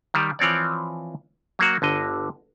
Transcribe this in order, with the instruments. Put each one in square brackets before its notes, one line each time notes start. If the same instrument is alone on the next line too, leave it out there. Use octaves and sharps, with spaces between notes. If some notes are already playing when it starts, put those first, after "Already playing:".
[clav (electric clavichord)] D#3 G3
E3 F3 C4 C#5 D5
F#3 A#3 F#4
G1 D3 D#5